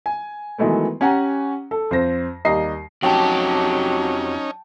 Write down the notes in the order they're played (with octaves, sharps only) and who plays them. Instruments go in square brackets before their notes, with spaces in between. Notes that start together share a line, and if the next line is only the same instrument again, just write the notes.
[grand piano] G#5
D#3 E3 F#3 G#3 A3 B3
C#4 G4 F#5 G#5 A#5
A4
F2 C5 A#6
D#2 G3 D#5 A#5 C7
[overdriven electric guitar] F2 G4 [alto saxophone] F#3 [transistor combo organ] C#4 D#4 [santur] G5 A5